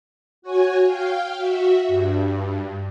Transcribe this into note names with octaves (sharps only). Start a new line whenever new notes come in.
F#4 C#5 G#5
F5 G5
F#4 E5
G2